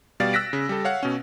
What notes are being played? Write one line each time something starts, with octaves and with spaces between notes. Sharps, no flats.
B2 G3 D5 F5 A6
E6 F#6 A#6 B6 D7
C#3
G3 A4
C#5 F5 F#5
B2 C#4